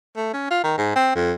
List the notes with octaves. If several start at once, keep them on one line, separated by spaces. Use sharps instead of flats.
A3
C#4
F4
D#3
G#2
C4
F2